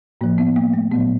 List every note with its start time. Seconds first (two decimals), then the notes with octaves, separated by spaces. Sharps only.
0.21 A2 F3 A#3
0.38 B3
0.56 A#3
0.74 A3
0.91 A#2 F#3 B3